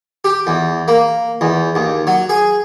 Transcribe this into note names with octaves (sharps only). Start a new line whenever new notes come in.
G4
E2
A#3
E2
D#2
F#3
G#4